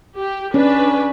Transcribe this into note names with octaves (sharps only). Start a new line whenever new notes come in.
G4
C#4 D4 B4